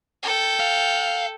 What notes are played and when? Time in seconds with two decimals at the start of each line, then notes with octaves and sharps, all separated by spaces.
0.23 A4 G5
0.60 F5